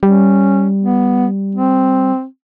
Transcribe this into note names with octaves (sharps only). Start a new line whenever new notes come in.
G3 C#4
B3
C4